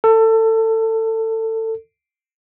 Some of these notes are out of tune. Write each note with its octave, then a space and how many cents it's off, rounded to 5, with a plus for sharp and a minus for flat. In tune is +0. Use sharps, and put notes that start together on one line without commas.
A4 +25